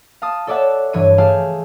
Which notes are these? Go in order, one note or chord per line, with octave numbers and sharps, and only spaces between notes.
F5 A5 D#6
A4 C#5 D5 E5 F#5 A5
G2 E3 C#5 C#6 G#6 D#7
A3 G4 G#4 F5 G#5 A5